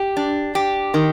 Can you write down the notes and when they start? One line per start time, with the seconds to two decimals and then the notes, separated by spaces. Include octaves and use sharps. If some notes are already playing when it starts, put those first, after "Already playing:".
Already playing: G4
0.17 D4
0.55 G4
0.94 D#3